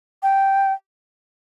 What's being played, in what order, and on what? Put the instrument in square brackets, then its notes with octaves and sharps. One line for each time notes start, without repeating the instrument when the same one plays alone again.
[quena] G5